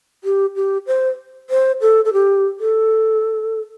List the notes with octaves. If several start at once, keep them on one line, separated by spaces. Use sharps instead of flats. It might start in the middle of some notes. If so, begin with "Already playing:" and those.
G4
G4
C5
C5
A4
A4
G4
A4